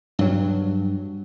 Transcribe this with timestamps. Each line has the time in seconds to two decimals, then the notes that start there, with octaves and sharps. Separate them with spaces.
0.19 G2 F#3